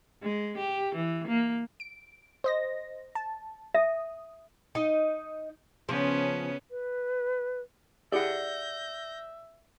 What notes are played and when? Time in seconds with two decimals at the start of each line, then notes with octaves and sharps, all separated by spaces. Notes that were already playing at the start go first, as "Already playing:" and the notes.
0.23 G#3
0.58 G4
0.95 E3
1.28 A#3
1.80 D7
2.44 C5 D#5 A#6
3.15 A5
3.75 E5 D#6
4.75 D#4 D#5
5.89 C#3 F3 B3 C#4
6.71 B4
8.12 E4 G4 G#4 D5 E5 F#5 G6 A#6